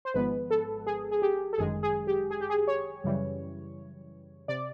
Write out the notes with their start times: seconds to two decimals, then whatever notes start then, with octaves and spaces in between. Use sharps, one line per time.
0.05 C5
0.14 G#1 G#2 F3 G#3 B3 B4
0.51 A4
0.87 G#4
1.11 G#4
1.22 G4
1.53 A4
1.58 G1 F#2 D#3 G#3 G#4
1.83 G#4
2.07 G4
2.31 G#4
2.40 G4
2.50 G#4
2.67 C#5
3.04 F#2 C#3 E3 G3
4.48 C3 D5